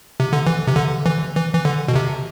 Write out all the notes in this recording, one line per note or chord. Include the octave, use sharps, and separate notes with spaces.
C3
D3
E3
C3
D3
E3
E3
E3
D3
B2
C3